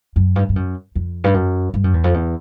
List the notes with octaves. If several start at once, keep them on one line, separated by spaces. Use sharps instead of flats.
F#2
G2
G2
F#2
F2
G2
F#2
G2
F#2
E2
F2
E2